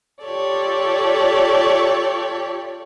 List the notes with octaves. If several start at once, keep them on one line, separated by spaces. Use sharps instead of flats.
F4 G4 A4 C#5 D5